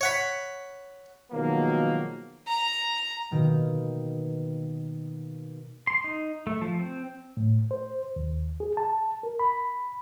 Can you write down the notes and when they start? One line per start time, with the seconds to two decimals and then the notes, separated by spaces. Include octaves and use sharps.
0.01 C#5 F#5 B5
1.32 B2 D#3 F3 F#3 G#3 A#3
2.47 A#5
3.31 B2 D#3 A#3
5.87 C6
6.04 D#4
6.47 A3
6.62 F3
6.79 C4
7.37 A2
7.71 C5
8.16 D#2
8.60 G#4
8.77 A5
9.23 A#4
9.39 B5